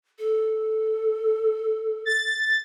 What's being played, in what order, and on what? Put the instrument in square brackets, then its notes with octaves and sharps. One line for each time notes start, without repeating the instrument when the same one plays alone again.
[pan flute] A4
[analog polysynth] A6